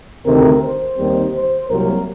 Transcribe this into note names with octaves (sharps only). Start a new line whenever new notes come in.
D2 C3 D#3 A3 C4 A#4
C5
D#2 D#3 G3 C4
C5
C2 C3 F#3 A#3 A#4